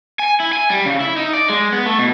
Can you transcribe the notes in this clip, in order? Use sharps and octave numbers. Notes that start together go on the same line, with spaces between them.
G#5
E4
G#5
G3
C#3
E4
D#4
D5
G#3
B3
A3
B2